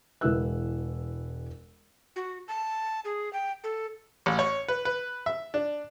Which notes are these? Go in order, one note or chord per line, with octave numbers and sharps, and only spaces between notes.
E1 G#3 E4 B4 E6 F#6
F#4
A5
G#4
G5
A4
A1
C#5
B4
B4
E5
D4